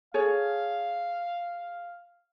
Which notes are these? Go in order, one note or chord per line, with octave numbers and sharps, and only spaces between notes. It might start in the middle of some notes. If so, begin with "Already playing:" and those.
G#4 A4 C#5 F5